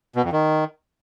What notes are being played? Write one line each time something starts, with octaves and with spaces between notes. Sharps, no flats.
B2
F2
D#3